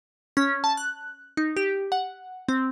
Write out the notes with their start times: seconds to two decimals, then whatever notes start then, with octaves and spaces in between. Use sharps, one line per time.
0.37 C#4
0.64 A5
0.77 F#6
1.37 D#4
1.56 G4
1.92 F#5
2.49 C4